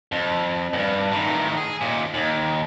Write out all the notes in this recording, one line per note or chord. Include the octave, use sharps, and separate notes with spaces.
F2
E2 G2
A2 D#3
G#4
D#2 A#2
D#2